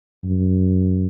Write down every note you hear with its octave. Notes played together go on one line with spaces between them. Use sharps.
F#2